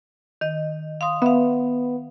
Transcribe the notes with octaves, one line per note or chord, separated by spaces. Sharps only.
D#3 D#5
F5 C6 D#6
B3 E5 F5